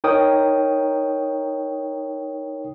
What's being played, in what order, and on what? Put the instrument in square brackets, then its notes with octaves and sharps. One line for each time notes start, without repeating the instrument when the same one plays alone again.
[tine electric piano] D#4 A#4 C#5 G5 D#6